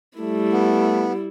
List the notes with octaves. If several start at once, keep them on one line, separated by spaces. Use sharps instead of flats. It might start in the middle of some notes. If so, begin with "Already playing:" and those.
G3 A3 E4
B3